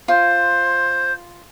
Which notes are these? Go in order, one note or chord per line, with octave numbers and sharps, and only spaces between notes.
F4 C5